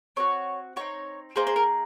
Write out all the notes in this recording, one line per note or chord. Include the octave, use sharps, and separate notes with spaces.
C4 F#4 C#5
C4 D#4 F#4 C#5
A#3 D#4 G#4 C5
C5
A#4